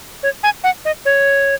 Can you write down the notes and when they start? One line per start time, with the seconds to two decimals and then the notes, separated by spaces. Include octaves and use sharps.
0.23 C#5
0.43 G#5
0.64 F#5
0.85 D#5
1.05 C#5